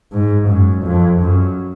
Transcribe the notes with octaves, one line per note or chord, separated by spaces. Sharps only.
G#2
F#2
F2
F#2